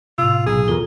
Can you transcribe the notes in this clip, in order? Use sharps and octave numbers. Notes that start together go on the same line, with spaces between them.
A2 C3 F4 E6
B1 G#4
E2 F4 A4 A#4 G7